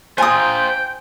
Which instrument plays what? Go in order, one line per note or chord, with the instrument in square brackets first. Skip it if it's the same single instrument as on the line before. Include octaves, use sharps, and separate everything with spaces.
[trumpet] F4 [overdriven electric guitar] C5 A#5 [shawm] G5 [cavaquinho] G#5 D#6